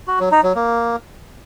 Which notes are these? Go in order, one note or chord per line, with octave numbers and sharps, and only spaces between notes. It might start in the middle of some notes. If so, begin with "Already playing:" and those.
F#4
F#3
D#4
F#3
A#3